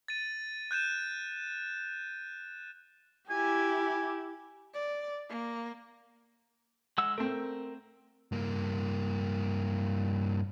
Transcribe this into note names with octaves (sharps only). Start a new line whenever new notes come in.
A6 D#7
F#6 G6 D#7 E7
E4 G4 G#5
D5
A#3
G#3 F#5 E6
A3 C4 A#4
G2 A#3